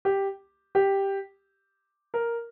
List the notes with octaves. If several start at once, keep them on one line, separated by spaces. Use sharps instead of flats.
G4
G4
A#4